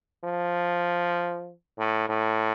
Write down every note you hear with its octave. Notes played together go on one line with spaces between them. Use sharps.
F3
A2
A2